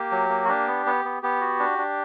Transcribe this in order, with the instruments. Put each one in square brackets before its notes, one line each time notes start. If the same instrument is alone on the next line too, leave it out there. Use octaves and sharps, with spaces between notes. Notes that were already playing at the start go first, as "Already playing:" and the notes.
Already playing: [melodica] A#3 G4
F#3
A#3
F#4
D4 G4
B3
B3
B3
B3 G4
F#4
D4
D4